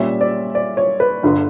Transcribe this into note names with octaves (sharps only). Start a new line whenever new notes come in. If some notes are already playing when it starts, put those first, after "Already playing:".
Already playing: A#2 G3 C#4 E5
D5
D5
C#5
B4
G1 G2 D3